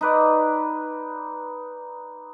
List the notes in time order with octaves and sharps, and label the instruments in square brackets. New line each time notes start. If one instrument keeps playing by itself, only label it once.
[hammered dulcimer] D#4 B4 D5